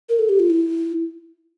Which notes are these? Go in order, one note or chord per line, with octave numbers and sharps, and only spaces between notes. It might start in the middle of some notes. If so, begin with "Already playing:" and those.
A#4
A4
G4
F4
E4